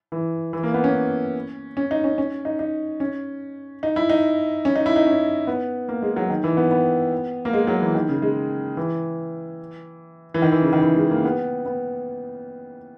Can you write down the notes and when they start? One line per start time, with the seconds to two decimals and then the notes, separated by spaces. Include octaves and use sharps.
0.12 E3
0.53 E3
0.63 A#3
0.74 B3
0.84 C#4
1.77 C#4
1.91 D#4
2.04 C#4
2.18 C#4
2.45 D#4
2.59 D#4
3.00 C#4
3.83 D#4
3.96 E4
4.10 D#4
4.65 C#4
4.76 D#4
4.86 E4
4.96 D#4
5.06 C#4
5.47 B3
5.89 A#3
6.02 G#3
6.16 F#3
6.30 D#3
6.44 E3
6.57 B3
6.71 B3
7.45 A#3
7.53 G#3
7.67 F#3
7.81 E3
7.95 D#3
8.09 C#3
8.22 G#3
8.77 E3
10.34 E3
10.42 D#3
10.52 E3
10.62 C#3
10.73 D#3
10.83 E3
10.97 G#3
11.10 A#3
11.24 B3
11.66 B3